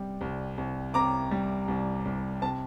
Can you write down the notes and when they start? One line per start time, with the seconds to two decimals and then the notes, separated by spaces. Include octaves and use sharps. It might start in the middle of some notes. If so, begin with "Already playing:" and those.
Already playing: C3 G3
0.21 C2
0.58 C2
0.94 C3 A#5 D6
1.31 G3
1.68 C2
2.05 C2
2.42 C3 A5